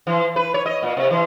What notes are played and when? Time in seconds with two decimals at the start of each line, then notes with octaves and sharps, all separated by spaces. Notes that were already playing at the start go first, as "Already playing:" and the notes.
0.07 E3
0.36 B4
0.54 C#5
0.66 D#5
0.83 A#2
0.97 C3
1.11 E3